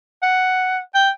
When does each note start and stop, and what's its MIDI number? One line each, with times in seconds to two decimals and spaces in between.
0.23 0.79 78
0.95 1.10 79